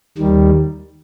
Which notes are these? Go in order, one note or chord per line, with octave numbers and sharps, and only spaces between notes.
D#2 D#3 G3